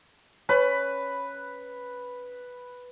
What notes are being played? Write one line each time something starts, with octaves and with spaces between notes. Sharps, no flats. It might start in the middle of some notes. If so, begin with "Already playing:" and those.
C#4 B4 B5